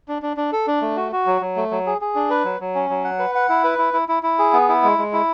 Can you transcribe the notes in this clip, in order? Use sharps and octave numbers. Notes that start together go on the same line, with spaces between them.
D4
D4
D4
A4
D4
A3
F#4
F#4
F#3
F#3
A3
F#3
G#4
G#4
D4
B4
F#3
F#3
C#4
F#3
F#5
B4
F#5
E4
B4
E4
E4
E4
E4
G#4
B3
E4
G#3
G#3
E4